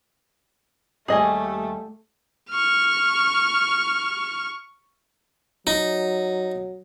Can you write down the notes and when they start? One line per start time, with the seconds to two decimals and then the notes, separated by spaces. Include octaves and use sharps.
1.08 D#2 G3 A3 G#4 D#5 G#5
2.50 C#6 F6
5.67 F#3 D#4